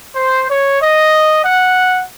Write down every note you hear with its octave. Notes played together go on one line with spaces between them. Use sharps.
C5
C#5
D#5
F#5